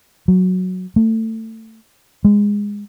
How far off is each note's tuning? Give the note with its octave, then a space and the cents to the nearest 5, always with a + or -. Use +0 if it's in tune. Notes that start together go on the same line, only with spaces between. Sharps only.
F#3 -5
A3 +25
G#3 -15